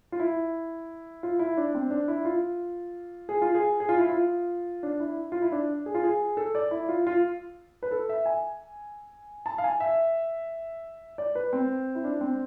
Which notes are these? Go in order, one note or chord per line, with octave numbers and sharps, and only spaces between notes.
F4
E4
F4
E4
D4
C4
D4
E4
F4
G#4
F4
G#4
G#4
F4
E4
F4
D4
E4
F4
E4
D4
G#4
F4
G#4
A4
D5
E4
F4
F4
B4
A4
E5
G#5
A5
F5
G#5
E5
D5
B4
C4
E4
D4
C4